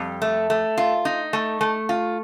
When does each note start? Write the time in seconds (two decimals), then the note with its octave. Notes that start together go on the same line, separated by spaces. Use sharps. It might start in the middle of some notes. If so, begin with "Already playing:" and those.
Already playing: F2 G3
0.22 A3
0.50 A3
0.77 F4
1.05 D#4
1.33 A3
1.61 A3
1.89 F4